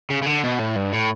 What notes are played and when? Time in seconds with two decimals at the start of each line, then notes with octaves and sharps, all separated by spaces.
0.10 C#3
0.23 C#3
0.26 D3
0.44 B2
0.59 A2
0.76 G2
0.93 A2